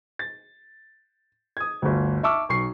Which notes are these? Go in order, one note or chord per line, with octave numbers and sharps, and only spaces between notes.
A6
D#6 G#6
G1 D2
E5 A5 C#6 D6 E6 F6
B1 C#6 C7